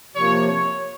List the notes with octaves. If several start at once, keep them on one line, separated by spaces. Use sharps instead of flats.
C3 F3 A#3 C#5
C#5